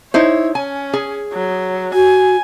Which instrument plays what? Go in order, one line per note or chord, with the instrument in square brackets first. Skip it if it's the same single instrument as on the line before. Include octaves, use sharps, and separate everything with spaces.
[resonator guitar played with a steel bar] D#4 E4 C5 [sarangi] C#5
[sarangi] C#4 [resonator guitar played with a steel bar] G#5
[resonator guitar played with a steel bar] G#4
[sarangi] F#3
[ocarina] F#4 [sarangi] G#5